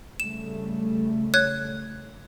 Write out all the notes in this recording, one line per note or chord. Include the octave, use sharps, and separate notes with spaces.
C#3 G3 A3 E7
C#5 F#6 G#6